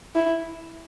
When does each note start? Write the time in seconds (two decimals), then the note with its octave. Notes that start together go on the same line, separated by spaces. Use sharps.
0.15 E4